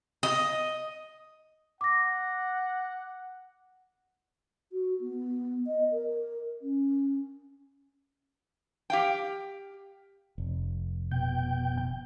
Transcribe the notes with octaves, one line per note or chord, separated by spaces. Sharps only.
D#5
F#5 D6 A#6
F#4
B3
D#5
A#4
C#4
G4 F5 G5
F1
B2 G5